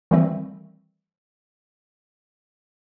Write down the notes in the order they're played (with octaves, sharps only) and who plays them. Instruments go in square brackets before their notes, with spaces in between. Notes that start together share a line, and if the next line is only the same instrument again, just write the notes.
[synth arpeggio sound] D#3 E3 G3 A3 C4